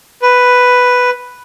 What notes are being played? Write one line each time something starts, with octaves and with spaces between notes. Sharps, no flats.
B4